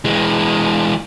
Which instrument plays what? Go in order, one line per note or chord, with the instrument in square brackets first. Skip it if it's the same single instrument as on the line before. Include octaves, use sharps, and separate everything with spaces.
[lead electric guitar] E3 G#3